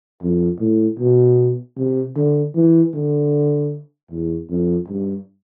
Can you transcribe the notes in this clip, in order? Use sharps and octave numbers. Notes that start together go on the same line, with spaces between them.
F2
A2
B2
C3
D3
E3
D3
E2
F2
G2